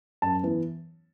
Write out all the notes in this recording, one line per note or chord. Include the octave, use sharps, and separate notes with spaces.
F#2 A5
E3 B3